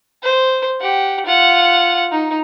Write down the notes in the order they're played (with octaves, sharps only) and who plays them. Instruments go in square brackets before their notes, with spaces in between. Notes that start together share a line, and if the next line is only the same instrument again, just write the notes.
[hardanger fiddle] C5
G4 F#5
F4 F#5
D#4